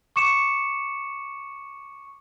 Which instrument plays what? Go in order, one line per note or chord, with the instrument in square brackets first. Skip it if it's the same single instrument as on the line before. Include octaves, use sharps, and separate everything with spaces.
[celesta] C#6 D6 C#7 E7